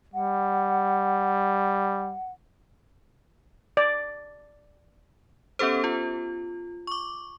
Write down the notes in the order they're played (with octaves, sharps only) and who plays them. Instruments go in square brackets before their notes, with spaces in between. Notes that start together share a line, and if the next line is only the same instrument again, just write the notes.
[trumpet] G3 [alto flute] F#5
[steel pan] D5
[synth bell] B3 C#4 G4 A4 C5
F4
C#6 D6